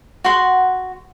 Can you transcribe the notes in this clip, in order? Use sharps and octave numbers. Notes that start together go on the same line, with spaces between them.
F#4 F#5 C6